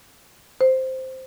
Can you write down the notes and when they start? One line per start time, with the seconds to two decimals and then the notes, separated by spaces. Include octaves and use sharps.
0.61 C5